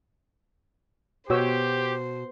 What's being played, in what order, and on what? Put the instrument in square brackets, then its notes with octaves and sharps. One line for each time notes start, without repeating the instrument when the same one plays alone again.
[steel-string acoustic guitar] B2 [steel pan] F#4 C#5 E6 [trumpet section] G4 [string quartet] C5